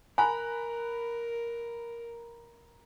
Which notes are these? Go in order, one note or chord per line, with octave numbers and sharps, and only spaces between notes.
A#4 G#5 A#5 B5 F#6